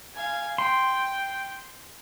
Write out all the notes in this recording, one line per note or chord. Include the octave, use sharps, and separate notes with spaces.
F5 G#5
G5 C6